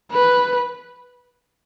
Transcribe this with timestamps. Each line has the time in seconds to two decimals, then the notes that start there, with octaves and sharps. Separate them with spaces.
0.12 B4